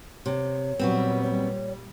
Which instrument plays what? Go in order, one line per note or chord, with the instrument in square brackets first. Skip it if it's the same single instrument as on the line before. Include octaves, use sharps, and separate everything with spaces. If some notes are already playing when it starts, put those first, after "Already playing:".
[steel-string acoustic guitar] C3 [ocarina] C#5
[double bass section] A#2 G3 [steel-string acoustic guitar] F#3 B3 C4
[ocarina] C#5